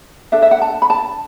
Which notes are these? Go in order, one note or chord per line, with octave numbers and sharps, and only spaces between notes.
D4 A4 E5
E5
F#5
A5
B5
A5